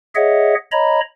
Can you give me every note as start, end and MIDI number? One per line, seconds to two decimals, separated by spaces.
0.15 0.54 68
0.15 0.54 73
0.15 0.54 75
0.15 0.54 76
0.15 0.54 78
0.71 1.00 73
0.71 1.00 75
0.71 1.00 82
0.71 1.00 83